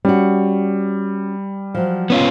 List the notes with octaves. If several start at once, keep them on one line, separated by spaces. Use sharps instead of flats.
G3 C#4 F#4
F3 F#3
B3 C#4 F4